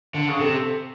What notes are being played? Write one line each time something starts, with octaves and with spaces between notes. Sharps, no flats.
D3
C#3
C3 A4